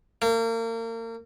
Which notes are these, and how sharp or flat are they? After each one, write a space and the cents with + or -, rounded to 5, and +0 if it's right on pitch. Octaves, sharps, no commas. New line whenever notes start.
A#3 -35